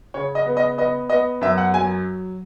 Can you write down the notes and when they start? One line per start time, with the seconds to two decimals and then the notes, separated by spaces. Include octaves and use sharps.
0.14 C#3 C#5
0.35 D#5
0.46 B3
0.57 D#5
0.78 B3 D#5
1.10 B3 D#5
1.41 F#2 E5
1.58 F#5
1.74 F#3 G#5